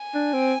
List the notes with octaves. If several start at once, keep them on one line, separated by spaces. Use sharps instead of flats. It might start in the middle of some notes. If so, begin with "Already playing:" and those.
Already playing: G#5
D4
C4